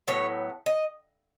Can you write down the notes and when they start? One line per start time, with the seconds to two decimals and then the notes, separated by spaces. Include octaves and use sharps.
0.07 A2 F#3 B3 C#5
0.66 D#5